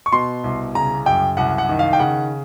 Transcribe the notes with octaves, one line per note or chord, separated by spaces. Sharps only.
C#6
B2 C6
C2
C#3 A#5
F#2 G5
C2 F#5
F#5
D#3
F5
G5
C#3 F#5